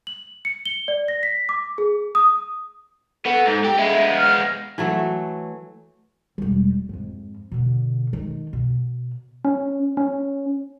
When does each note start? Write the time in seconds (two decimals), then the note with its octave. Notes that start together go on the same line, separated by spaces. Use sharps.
0.07 F#7
0.45 C#7
0.66 G7
0.88 D5
1.08 A#6
1.23 B6
1.49 D6
1.78 G#4
2.15 D#6
3.26 B3 F#4 A4
3.47 G#2
3.65 G4
3.78 G#3 B3 E5
4.18 F6
4.78 E3 F#3 A3
6.38 E1 G3
6.89 F2 G#2
7.52 B2 D3
8.13 D#3
8.53 B2
9.45 C#4
9.97 C#4